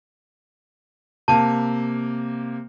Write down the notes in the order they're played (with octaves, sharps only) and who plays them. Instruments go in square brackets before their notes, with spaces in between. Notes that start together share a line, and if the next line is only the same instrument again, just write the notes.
[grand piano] C3 A#3 [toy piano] A5